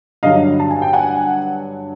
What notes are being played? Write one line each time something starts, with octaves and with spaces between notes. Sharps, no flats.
G2 D3 F#3 D#5 F5
A5
G#5
G5
F#5 G#5